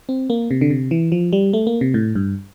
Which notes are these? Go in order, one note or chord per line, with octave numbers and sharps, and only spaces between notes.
C4
A#3
C3
D3
C3
E3
F3
G3
A3
A#3
C3
A2
G2